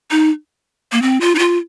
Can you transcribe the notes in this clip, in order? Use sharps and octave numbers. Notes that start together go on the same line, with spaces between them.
D#4
A#3
C4
F4
D#4
F4